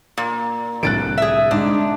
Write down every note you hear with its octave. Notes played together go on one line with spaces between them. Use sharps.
A#2
C2 A2 D3 F#6 A6 D7
G#4 E5
G#2 D4